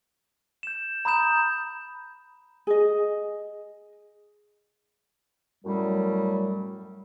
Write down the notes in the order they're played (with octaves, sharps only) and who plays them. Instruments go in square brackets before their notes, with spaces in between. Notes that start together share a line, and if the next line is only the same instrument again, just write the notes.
[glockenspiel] G6 E7
A#5 B5 D#6 G6 E7
[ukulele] G#4 D#5
[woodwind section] F#2 A2 F#3 G3